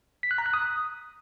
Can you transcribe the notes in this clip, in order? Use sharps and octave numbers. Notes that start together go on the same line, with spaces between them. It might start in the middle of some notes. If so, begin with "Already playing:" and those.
B6
F#6
A#5
F#6
D#6